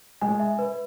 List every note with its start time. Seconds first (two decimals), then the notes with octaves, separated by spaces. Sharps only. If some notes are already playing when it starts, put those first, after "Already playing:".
0.21 G#3 G#5
0.40 E5
0.59 B4